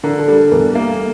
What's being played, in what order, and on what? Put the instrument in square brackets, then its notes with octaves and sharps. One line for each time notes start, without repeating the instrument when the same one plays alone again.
[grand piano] D3 [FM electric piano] A#4
[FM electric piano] A4
[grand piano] G3
[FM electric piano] A4
[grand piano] E2 [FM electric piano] A#4
[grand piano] A#3